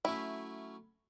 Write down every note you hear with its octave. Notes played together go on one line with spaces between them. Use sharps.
F#3 A3 C#4 E4